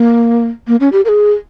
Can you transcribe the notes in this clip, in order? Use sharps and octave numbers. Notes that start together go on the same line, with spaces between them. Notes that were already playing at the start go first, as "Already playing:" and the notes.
Already playing: A#3
A#3
C#4
G4
A#4
G#4